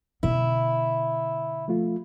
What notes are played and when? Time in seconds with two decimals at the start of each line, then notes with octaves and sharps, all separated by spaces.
0.23 B2 D3 E4
1.68 F3 A3 F4